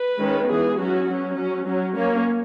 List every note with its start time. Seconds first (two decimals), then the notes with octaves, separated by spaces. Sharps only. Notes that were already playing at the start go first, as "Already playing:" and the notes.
Already playing: B4
0.19 D#3 G#3 C#4
0.47 E3 B3 G#4
0.78 F#3 C#4 F#4
1.07 F#3 C#4
1.36 F#3 C#4
1.66 F#3 C#4
1.94 F#3 A#3 C#4 C#5